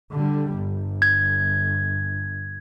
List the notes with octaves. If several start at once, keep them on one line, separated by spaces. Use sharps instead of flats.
D3 G3
G1
G#6